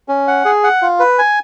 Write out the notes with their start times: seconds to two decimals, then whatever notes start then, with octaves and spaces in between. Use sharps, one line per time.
0.08 C#4
0.28 F#5
0.45 G#4
0.64 F#5
0.82 F4
1.00 B4
1.18 G#5